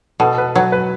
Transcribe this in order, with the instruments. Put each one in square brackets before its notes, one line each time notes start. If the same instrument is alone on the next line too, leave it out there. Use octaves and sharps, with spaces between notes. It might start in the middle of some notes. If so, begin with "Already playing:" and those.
[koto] B2 [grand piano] A4
[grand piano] B4
[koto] F#3 [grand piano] B4
[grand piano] B4